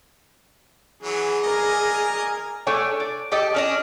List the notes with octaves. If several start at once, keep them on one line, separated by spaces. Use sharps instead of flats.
E3 F#3 G#4
A#4 D5 D#5 G#5
A3 D4 C#5 G#5
D5
G4 A4 D#5
C#4 D4 D#5